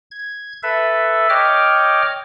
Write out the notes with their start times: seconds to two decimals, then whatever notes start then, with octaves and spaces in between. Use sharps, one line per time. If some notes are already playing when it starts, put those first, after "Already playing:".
0.11 G#6
0.63 A4 B4 E5
1.30 C#5 D#5 G5 D6 F6